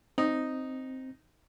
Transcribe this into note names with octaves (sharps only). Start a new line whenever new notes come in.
C4 D#4